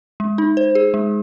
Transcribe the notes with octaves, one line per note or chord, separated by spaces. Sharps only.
G#3
D#4
C5
G#4
G#3